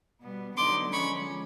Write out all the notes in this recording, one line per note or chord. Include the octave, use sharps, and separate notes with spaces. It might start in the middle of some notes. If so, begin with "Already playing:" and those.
B2 G3 B3
D3 F#3 B3 D#4 C6 D6
F3 G#3 C#4 B5 C#6